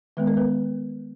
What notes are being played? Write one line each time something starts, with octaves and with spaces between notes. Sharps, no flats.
D#3 G#3 B3 B4
A#4
B3 B4